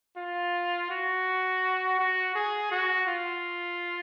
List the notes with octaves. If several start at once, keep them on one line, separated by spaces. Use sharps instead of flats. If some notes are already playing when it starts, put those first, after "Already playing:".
F4
F#4
F#4
G#4
F#4
F4